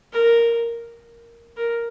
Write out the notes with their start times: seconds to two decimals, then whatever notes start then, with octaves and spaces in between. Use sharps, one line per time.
0.13 A#4
1.57 A#4